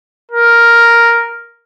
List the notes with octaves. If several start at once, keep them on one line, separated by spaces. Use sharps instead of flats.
A#4